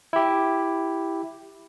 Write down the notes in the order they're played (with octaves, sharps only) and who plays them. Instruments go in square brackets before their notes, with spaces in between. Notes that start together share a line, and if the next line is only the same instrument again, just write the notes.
[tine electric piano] E4 G4